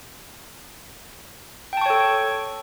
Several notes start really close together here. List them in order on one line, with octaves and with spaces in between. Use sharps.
G5 A5 C#6 C#5 A4